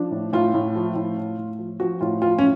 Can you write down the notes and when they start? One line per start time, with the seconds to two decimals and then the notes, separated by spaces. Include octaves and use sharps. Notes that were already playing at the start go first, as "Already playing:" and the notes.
Already playing: F3 D4
0.11 A2
0.33 A2 F4
0.54 A2
0.75 F3
0.95 A2
1.17 A2
1.38 A2
1.59 F3
1.80 F3 F#4
2.01 A2 F4
2.22 F3 F4
2.38 C#4